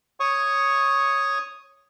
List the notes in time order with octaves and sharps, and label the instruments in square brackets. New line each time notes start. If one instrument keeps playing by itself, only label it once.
[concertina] C#5 C#6 D#6